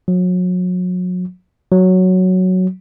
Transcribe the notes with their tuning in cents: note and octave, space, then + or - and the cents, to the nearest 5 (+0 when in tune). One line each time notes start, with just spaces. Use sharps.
F#3 -35
F#3 +0